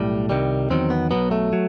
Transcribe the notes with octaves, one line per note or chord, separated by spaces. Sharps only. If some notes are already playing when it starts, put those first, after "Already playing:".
Already playing: B1 A2 G3
C2 C3 D#3 G3
E2 D#3 F#3 C4
B3
B1 B2 F#3 B3
A3
F#3